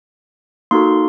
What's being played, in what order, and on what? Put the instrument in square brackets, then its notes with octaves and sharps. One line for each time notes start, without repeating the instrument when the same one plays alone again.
[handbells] A#3 D#4 F#4 A4 C6